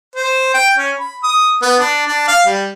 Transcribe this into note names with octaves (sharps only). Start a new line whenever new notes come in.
C5
G5
C#4
B5
D#6
B3
D4
D4
F5
G3